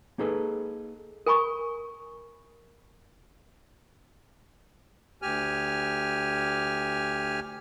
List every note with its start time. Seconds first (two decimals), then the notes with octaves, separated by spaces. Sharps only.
0.18 A#3 D#4 G#4 A4 B4
1.26 A#4 G#5 B5 C#6
5.22 D2 G4 G#5 F6